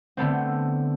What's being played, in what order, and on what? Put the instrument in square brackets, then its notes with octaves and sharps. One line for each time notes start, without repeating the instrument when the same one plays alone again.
[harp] D3 A3 B3 C4